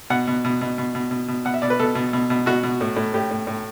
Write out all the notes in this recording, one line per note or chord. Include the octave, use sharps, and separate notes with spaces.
B2 F#5
B2
B2
B2
B2
B2
B2
B2
B2 F#5
E5
B2 D5
B4
B2 A4
B2
B2
B2
B2 F#4
B2
A2
A2
A2 G4
A2
A2